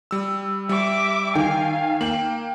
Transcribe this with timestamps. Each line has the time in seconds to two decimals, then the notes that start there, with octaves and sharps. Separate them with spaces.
0.11 G3 E6
0.69 G3 E5 D6
1.35 D#3 F5 G5 G#5
2.01 A#3 G5 F#7